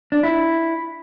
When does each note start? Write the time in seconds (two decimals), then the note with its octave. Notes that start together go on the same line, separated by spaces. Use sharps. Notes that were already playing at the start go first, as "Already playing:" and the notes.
0.12 D4
0.23 E4